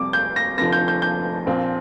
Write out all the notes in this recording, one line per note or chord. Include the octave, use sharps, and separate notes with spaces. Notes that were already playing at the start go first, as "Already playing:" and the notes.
Already playing: F2 C3 G3 D6
G6
A#6
F1 F2 D3 F3 A#6
G6
G6
G6
A#1 A#2 F3 C4